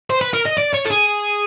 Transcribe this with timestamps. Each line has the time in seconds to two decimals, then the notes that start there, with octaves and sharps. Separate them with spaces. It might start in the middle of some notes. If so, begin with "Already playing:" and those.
0.10 C5
0.21 B4
0.34 A#4
0.46 D#5
0.58 D5
0.74 C#5
0.86 A4
0.91 G#4